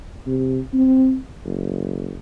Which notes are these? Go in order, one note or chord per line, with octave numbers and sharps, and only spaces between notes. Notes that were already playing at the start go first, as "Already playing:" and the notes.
C3
C4
F#1